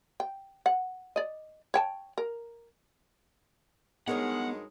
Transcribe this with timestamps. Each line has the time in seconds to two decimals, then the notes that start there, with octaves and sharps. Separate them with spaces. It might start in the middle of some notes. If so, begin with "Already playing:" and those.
0.20 G5
0.66 F#5
1.16 D5 D#5
1.74 C#5 G5 A5
2.18 A#4
4.08 G2 F#3 G#3 B3 D#4 A#4 C#5 F#5